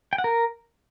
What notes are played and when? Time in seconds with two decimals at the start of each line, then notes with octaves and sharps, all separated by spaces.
0.13 G5
0.18 F#5
0.24 A#4